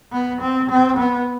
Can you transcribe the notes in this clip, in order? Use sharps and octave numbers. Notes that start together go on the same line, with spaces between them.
B3
C4
C4
B3